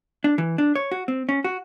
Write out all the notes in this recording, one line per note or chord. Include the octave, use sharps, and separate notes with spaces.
D4
E3
D4
C#5
F#4
C4
C#4
F#4